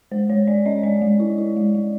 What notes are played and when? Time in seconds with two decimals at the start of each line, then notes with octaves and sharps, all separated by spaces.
0.11 G#3 C5
0.29 G#3 C#5
0.47 G#3 D5
0.66 C#4 D#5
0.83 G#3 D5
1.02 G#3
1.20 E4
1.38 E4
1.56 G#3
1.75 G#3